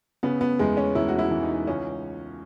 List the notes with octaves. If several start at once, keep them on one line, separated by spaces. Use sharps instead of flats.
C#3 B3
B3
E2 G#3
C#4
E1 E4
F#4
E4
E3
D#4
C#2 C#4